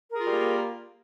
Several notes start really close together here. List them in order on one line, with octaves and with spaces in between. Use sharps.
A#4 G#4 F4 G3 A#3